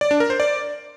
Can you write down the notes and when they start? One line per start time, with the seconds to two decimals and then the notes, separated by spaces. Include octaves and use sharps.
0.01 D5
0.11 D4
0.20 A#4
0.30 C5
0.40 D5